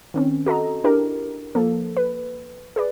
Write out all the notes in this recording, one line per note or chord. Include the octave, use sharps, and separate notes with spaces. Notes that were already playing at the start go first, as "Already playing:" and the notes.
D#3 C4 C#4
F#4 A4 D#5 A#5
D4 E4 G4 A#4
F3 A#3 A4
B4
G#4 B4 D5